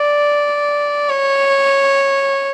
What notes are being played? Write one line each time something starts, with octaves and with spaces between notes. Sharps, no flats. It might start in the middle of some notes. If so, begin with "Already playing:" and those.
Already playing: D5
C#5